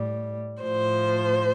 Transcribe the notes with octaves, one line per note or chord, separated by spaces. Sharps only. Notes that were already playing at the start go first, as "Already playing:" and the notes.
Already playing: A2 G3
A2 F3 C5